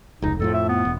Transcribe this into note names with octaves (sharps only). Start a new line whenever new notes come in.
F1 C#2 D#4
F2 A2 F3 A4
E5
B3
E1